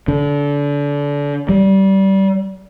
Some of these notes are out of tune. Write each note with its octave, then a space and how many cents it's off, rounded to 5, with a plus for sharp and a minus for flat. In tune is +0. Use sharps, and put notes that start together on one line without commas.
D3 -30
G3 -20